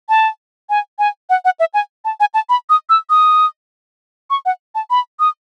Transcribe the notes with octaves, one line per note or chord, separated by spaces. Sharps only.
A5
G#5
G#5
F#5
F#5
E5
G#5
A5
G#5
A5
B5
D#6
E6
D#6
C#6
F#5
A5
B5
D#6